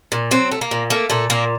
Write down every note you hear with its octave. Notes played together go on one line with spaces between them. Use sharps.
A#2
F#3 C4
A3
A#3
A#2
A3 A#3
A#2 A3
A#2 A#3